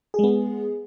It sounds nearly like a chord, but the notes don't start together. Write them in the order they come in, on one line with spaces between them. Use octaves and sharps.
G#4 G#3 B3